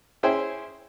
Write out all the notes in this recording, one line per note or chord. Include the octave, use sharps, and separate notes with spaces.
C#4 E4 G#4 C5 G5